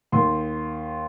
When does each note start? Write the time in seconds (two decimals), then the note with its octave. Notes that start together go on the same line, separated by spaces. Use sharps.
0.12 D#2 D#3 C6